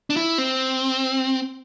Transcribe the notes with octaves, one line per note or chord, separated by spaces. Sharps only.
D4
E4
C4